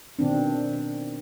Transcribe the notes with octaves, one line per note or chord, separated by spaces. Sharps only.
B2 D#3 C4 D4